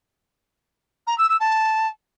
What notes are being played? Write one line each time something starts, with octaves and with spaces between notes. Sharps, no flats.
A#5
E6
E6
A5